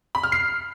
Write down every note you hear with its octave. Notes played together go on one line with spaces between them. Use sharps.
B5
F6
C7